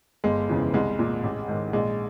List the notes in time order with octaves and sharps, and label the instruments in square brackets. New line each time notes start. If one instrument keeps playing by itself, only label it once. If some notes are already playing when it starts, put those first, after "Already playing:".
[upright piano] G1 G#3
F2 C#3 E3
C2 G#3
A#2
A1
G#2 D#3
A#1 G#3